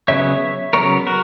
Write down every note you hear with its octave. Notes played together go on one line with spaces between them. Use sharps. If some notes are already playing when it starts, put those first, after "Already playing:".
C#3 F#3 B3 C#5 E5
C#3 F#3 B3 A#4 C#5
F#4 A#4